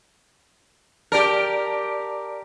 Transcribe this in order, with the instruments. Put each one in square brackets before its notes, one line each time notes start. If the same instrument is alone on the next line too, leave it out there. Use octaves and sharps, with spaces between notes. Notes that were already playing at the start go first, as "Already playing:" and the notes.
[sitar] G4 A#4 [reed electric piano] D5 A5